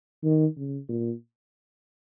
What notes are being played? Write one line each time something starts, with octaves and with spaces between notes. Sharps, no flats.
D#3
C#3
A#2